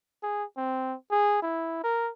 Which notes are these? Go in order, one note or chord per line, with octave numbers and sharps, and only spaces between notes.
G#4
C4
G#4
E4
A#4